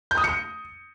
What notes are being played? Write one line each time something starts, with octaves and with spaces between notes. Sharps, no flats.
G6
D#6
C#7